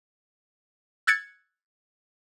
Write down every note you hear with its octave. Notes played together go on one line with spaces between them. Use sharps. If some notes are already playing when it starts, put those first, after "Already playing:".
E6 F#6 G#6 A6 C#7